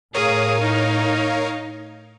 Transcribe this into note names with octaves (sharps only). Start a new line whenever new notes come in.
A2 G#4 A#4 C#5 F5 D#6
D#4